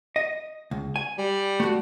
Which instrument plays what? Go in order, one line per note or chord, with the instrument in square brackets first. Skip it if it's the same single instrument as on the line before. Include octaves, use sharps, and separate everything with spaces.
[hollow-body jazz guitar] D#5
C#2
G#5
[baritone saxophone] G3
[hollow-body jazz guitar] A3 F#4